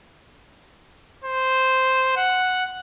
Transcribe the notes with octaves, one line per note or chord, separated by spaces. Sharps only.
C5
F#5